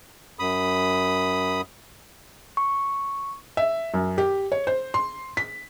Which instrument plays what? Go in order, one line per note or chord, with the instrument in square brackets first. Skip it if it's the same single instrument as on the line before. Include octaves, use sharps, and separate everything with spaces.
[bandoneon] F#2 B5 D#6
[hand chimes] C#6
[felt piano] E5
F#2
G4
C#5
C5
C6
B6